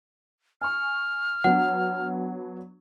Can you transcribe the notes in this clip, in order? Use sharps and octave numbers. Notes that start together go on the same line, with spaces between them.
G#5 C#6 F6
F#3 B3 D4 F#5